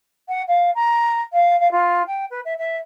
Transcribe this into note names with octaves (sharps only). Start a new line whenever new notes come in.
F#5
F5
A#5
F5
F5
F4
G5
B4
E5
E5